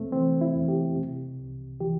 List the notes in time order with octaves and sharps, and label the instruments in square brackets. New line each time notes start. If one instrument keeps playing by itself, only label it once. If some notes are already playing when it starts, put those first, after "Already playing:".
Already playing: [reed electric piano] E2 C3 A3 C4
E3 C4
E4
E2
G4
C3
C2
E3 G4